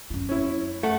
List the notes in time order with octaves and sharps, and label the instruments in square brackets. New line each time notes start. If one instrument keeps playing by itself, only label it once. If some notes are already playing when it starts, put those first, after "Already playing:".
[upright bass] F#2 F4
[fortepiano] C#4 E4
[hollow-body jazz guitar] A3 [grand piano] F#5